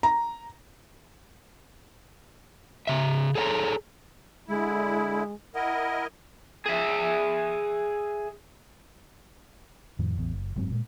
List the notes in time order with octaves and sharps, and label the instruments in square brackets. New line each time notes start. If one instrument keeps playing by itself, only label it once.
[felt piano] A#5
[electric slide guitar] C#3 E5
G#4 A4 C#5 F5 A#5
[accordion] D3 E4 [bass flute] G#3
[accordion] E4 A#4 D#5 [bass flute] F#5
[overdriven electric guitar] G#4 E5
[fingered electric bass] F2 A2 D#3 F3
A1 E2
F#1
F#1 G#2 F#3 C4
A#2 G#3